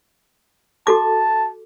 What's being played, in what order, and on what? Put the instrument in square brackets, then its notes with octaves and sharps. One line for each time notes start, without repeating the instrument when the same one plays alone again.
[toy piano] F#4 A4 D6 [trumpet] A5